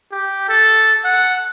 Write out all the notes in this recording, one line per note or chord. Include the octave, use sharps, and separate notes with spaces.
G4
A4
F#5